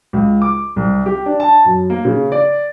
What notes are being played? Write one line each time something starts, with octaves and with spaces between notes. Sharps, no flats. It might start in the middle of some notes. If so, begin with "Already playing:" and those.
C#2
D6
C2
G4
D4
A5
F#2
A#3
C#3
D5